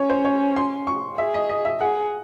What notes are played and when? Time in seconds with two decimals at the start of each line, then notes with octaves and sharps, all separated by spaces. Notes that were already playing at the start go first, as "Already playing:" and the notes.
Already playing: C#4 C#5
0.10 C5
0.25 C#5
0.56 C6
0.87 C#6
1.18 G#4 E5
1.34 D#5
1.49 D#5
1.65 E5
1.80 G#4 F#5